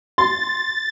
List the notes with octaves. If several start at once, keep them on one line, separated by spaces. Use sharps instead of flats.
C6 A6